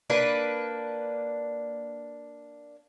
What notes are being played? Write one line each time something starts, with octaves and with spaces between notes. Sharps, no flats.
A#3 D4 B4